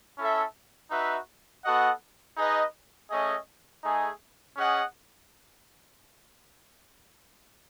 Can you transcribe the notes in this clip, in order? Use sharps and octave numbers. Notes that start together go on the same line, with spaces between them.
C#4 E4 A4 E5
D#4 F#4 B4 E5
B3 F#4 A4 D#5 F#5
D#4 G#4 B4 D#5
A3 C#4 G#4 D#5
A3 D#4 G#4
C#4 G#4 D#5 F#5